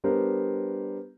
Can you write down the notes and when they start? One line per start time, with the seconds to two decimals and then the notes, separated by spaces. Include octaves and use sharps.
0.04 G3 B3 D4 G4 A#4 C5